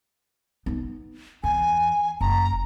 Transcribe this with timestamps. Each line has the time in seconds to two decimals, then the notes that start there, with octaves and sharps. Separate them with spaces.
0.66 B3 D#4
1.44 E2 G#5
2.21 F#1 A#5